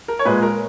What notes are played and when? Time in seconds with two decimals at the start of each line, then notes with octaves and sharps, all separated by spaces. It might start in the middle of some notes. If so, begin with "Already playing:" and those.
0.08 A#4
0.19 C#5
0.25 A#2 G#3 B4
0.42 A#4